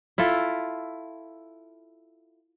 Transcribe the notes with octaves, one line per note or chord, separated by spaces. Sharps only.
E4 F4 A4